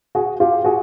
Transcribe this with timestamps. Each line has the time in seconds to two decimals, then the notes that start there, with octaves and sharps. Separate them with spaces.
0.15 F#4 G#4
0.40 F4 G4
0.64 F#4 G#4